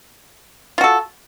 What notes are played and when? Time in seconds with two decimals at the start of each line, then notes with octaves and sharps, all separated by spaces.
0.78 F4
0.81 F#4
0.84 A4